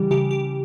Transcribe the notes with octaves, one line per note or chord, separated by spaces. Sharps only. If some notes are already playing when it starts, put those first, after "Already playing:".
Already playing: C#3 E3 G3 G4
C#3 G4
G4